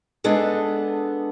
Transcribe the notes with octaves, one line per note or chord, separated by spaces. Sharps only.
G#3 B3 D4 G#4 A4